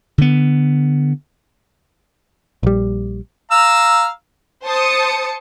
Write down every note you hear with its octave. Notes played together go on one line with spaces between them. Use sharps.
D3 B3
A#1 G3
F5 A#5 E6
C5 A5 D#6 C#7